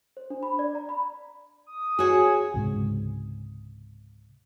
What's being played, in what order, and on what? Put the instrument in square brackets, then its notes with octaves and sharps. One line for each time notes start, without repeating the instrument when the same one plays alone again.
[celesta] C5
D4
B5
D5
A#5
B5
[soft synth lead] D#6
[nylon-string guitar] F#4 C#5 [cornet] G#4
[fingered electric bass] C#2 G#2 C3